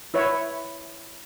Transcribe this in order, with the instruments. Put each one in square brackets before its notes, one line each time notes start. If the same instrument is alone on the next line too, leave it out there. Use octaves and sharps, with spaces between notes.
[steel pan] E4 B4 C#5 E5